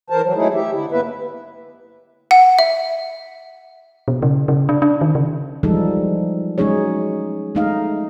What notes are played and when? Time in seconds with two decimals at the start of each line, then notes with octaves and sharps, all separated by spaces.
0.10 E3 A#4 C5 A5
0.23 E3 F#3
0.35 F#3 G#3 A3 D#4 E4 G#4
0.54 G4 E5
0.72 D3 E4
0.91 G2 A#3 B3 B4 E5
2.31 F#5
2.59 E5
4.08 B2
4.22 C#3
4.48 C#3
4.69 D4
4.82 D4
5.01 D#3
5.15 C#3
5.63 E3 F3 G3 G#3 D#4 A4
6.58 F#3 G#3 C#4 D#4 G#4 C#5
7.55 G#3 A3 D#4 D#5 F5